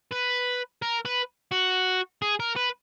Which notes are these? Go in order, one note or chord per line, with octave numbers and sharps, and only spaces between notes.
B4
A#4
B4
F#4
G#4
A#4
B4